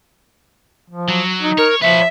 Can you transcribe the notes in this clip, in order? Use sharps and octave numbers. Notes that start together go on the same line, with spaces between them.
F3
F#3
D#4
A#4 C#5
F3 B4 C#5 E5